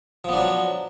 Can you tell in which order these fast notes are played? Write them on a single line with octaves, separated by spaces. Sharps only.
F3 B3 D4 F#3